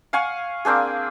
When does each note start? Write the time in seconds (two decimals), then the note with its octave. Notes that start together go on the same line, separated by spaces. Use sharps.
0.13 F5 F#5 G#5 C#6
0.65 A#3 C4 D4 G#4